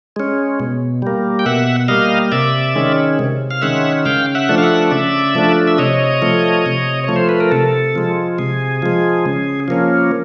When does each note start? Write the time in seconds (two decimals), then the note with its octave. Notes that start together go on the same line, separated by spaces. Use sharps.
0.16 G#3 C#4
0.60 B2
1.02 G3 A#3
1.39 G5
1.46 B2 E5 F#5
1.88 G3 A#3 D#5 F5
2.32 C3 D5 E5
2.75 D#3 G#3 C#4
3.19 C3
3.51 F5
3.62 D#3 G#3 C#4 E5 F#5
4.05 C#3 F5 G5
4.35 E5 F#5
4.49 F3 A3 D4
4.58 F5
4.63 E5 F#5
4.91 C#3 D5 E5
5.35 F3 A3 D4
5.68 E5
5.78 C3 C#5 D#5
6.22 F3 A3
6.66 C3
7.04 F3 A3 C#5
7.16 C5
7.29 B4
7.40 A#4
7.51 C3 A4
7.95 F3 G#3
8.38 C3 G#4
8.82 F3 G#3
9.26 C#3
9.68 F3 A#3 C#4